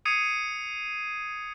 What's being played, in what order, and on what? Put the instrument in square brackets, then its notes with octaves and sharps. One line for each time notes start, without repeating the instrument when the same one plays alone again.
[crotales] D#6 G#6 C7 C#7 D#7